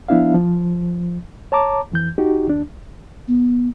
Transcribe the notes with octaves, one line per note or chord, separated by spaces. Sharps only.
F3 B3 D4 E4 E5 F5
F3
C#5 A5 A#5 D6
F2 E3 G6
D#4 F#4 G4
D#2 D4
B3